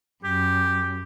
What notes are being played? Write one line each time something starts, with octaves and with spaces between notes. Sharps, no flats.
F#2 G4